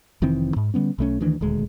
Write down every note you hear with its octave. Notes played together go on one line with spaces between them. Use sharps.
F1 D#3 E3 C4
G#2
D3 G3 B3 C#4
B1 A3 C#4
D2 D#3 E3 D4
D#1 D2 G#3